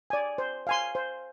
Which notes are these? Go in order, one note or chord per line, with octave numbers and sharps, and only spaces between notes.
D5 G#5
C5
F5 G#5 C6
C5